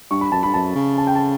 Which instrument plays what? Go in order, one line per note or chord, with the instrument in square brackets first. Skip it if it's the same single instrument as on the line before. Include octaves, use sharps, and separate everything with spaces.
[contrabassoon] G2 [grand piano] C#6
[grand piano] B5
[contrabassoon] F#2 [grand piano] A5
[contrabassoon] G2 [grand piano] B5
[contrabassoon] F#2 [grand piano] A5
[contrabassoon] C#3
[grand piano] A5
G5
A5